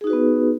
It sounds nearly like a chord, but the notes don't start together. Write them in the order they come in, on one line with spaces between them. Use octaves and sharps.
G#4 D#4 F#4 B4 B3